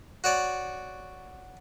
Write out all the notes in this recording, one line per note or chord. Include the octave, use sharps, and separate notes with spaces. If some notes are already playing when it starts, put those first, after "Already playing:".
F#4 C#5 D5